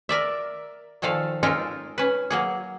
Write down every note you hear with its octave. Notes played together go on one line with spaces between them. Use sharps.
A#4 D5 E5
A#2 D#3 F3 A4 F5
G#3 C#4 D#4 F4 A4 A#4
C#4 B4
F#3 A#3 G#4